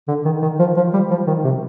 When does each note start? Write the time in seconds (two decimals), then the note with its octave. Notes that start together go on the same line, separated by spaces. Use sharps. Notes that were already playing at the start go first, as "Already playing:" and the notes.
0.08 D3
0.25 D#3
0.42 D#3
0.60 F3
0.77 F3
0.93 G3
1.10 F3
1.27 D#3
1.44 C3